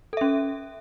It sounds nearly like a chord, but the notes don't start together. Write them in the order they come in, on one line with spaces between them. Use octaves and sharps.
A4 E5 C#4